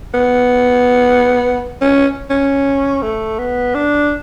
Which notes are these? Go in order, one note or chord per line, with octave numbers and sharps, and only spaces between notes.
B3
C#4
C#4
A3
B3
D4